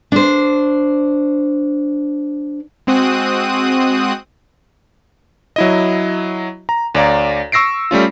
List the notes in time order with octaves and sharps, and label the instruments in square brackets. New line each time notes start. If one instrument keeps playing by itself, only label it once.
[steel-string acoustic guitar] D4 C5
[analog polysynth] G#3 C4 F#4 D#6 F#6 D#7
[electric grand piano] F#3 E4 D#5
A#5
D2 C#5 D5 F5 A#5
C#6 E6 A#6 C7 D7
G3 A3 C#4 F4